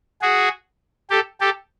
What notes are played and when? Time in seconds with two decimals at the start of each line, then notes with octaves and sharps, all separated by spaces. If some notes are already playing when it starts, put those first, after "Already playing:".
0.22 F#4 G#4
1.10 G4 A4
1.41 G4 A4